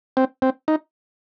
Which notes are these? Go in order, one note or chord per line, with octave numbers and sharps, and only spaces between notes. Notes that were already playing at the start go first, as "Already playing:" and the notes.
C4
C4
D#4